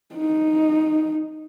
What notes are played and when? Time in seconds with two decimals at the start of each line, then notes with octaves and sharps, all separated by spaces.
0.15 D#4